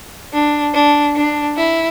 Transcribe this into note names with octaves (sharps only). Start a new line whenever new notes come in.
D4
D4
D4
E4